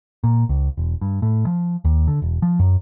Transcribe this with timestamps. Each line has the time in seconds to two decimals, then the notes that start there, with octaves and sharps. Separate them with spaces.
0.24 A#2
0.49 C#2
0.77 E1
1.01 G2
1.22 A2
1.47 F3
1.85 D#2
2.07 D3
2.22 E1
2.42 F3
2.59 F#2